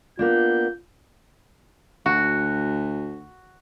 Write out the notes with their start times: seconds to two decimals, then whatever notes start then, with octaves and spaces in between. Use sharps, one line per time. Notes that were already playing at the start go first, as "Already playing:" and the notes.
0.19 A#3 B3 D4 F4 G6
2.06 D2 F#4